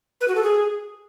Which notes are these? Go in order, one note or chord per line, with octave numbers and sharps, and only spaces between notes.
B4
F#4
A4
G#4